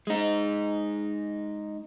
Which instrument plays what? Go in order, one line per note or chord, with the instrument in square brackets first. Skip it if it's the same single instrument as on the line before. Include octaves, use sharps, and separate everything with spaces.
[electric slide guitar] G#3 D#4